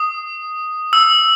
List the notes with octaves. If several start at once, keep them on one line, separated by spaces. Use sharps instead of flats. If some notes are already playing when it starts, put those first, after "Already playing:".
Already playing: D#6
E6